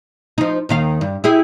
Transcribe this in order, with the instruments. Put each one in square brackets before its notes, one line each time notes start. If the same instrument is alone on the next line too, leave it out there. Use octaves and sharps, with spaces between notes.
[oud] F3 D#4
D#2 D#3 F5
G2
E4 G4 G#4